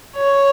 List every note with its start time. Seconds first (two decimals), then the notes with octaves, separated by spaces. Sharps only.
0.16 C#5